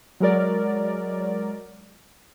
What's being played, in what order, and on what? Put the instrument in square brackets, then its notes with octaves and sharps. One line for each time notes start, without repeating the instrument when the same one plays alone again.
[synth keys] F#3 G#3 A#4 D5